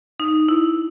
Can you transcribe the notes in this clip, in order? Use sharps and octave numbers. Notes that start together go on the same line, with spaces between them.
D#4
E4